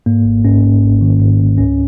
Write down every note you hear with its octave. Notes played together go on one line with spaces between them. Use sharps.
G#2 A#3
G#1
G#2 C#4
G#2
G#1
D#3
G#2
G#2
C#2 C#4